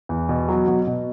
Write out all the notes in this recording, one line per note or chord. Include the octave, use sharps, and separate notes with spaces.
E2
B2
F#3
B2
B2